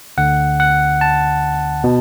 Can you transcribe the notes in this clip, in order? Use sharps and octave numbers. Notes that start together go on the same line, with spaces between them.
D2 D3 F#5
F#5
A5
B2